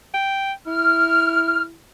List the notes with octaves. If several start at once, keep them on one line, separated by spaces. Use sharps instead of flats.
G5
E4 F6